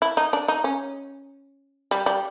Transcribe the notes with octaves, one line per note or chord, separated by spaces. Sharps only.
E4
D#4
D4
D#4
C#4
G3
G3